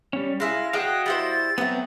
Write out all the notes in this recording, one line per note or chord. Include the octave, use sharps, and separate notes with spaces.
G3 C#4
G#3 E4 F5 G#5 A#6
F#4 G#4 D#5 F5 G5 A5 F#6
G3 E4 C5 A6
F#3 A3 B3 C4